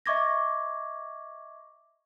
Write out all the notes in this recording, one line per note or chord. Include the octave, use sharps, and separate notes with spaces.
D#5 E5 C#6 D6 G#6 A#6